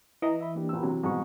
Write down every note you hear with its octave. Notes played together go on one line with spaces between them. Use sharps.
E3 D#5 A#5
E5 B5
A#3 D4 G4
A#1 E6
C3 F#3
G#2 B2 G3 C4 C#6